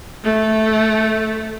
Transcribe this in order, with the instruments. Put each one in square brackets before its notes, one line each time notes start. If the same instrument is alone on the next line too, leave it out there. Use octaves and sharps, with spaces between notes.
[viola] A3